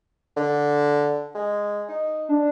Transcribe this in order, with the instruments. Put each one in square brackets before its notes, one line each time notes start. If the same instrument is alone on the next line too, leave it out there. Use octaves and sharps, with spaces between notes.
[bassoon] D3
G#3
D#4
[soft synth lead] D4